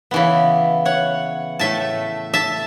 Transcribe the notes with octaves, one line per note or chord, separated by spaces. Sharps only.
C#3 E3 B3
C#5 F#5
A2 A3 E5 A5
E5 A5